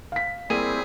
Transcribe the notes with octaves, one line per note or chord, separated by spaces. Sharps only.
F5 B6
G3 A#3 C4 E4 G#4 D#7